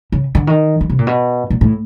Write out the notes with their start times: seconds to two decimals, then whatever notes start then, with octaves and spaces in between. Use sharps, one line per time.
0.12 C#3
0.35 D3
0.47 D#3
0.81 D#3
0.90 C3
0.99 A#2
1.07 B2
1.50 A#2
1.61 A2